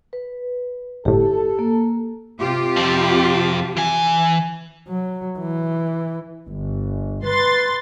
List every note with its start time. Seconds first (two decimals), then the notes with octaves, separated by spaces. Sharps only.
0.13 B4
1.05 G1 A2 G4 A4
1.59 A#3
2.39 C3 F4 G4
2.77 F2 F3
3.77 E3 G#5
4.88 F#3
5.39 E3
6.48 G1
7.24 B4 C6 A6